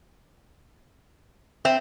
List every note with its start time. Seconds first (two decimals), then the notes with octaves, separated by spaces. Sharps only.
1.65 C4 E5